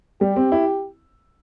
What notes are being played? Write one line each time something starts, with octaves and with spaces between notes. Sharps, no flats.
G3 G4
C4
E4